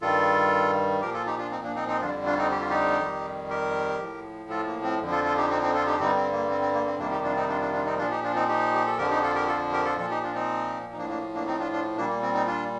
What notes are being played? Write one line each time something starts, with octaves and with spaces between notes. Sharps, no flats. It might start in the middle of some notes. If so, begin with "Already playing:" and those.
G2 D#3 G3 F4 A4
A#2 F3 G4 A#4
F4 A4
D#4 G4
D4 F4
C4 D#4
A#3 D4
C4 D#4
C4 D#4
F2 D3 G3 D4 F4
D4 F4
C4 D#4
G4
F4
D#4 G4
F2 D#3 G3
G4 A#4
A2 F3
F4 A4
A#3
C4
F2 D3 F3
F4 A4
F4 A4
D#4 G4
C4 D#4
C4 D#4
F4 A4
D#4 G4
G2 D3 G3 C4 D#4
C4
A#3
C4
C4
A#3
C4
F2 C3 D#3 G3 A#3 D4
D#4 G4
D4 F4
C4 D#4
D4 F4
D4 F4
D4 F4
C4 D#4
A#2 F3 D4 F4
D#4 G4
D4 F4
C4 D#4
D#4 G4
G4
A4
F2 D3 F3 G4 A#4
D#4 G4
F4 A4
G4 A#4
F4 A4
G4 A#4
F4 A4
A#2 F3 F4 A4
D#4 G4
D4 F4
C4 D#4
D#4
A2 F3 A#3 D4
A#3 D4
A#3 D4
C4 D#4
D4 F4
D4 F4
A#2 G3 A#3 D4
A#3
C4
C4 D#4
D4 F4